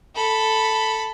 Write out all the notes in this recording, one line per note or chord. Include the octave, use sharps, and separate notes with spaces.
A4 B5